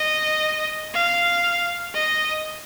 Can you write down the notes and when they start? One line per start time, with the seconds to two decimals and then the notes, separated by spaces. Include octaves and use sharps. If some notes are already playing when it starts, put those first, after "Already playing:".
Already playing: D#5
0.93 F5
1.94 D#5